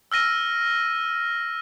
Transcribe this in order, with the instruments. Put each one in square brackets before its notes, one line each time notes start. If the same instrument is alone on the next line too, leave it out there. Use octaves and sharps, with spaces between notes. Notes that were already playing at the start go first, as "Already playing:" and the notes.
[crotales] E6 F6 A#6 D#7